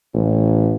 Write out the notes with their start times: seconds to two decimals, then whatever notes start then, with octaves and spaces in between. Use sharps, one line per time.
0.14 A1